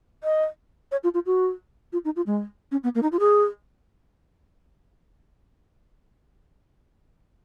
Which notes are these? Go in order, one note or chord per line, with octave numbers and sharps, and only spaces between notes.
D#5
C#5
F4
F4
F#4
F4
D#4
F4
G#3
C#4
B3
A#3
D#4
F4
G#4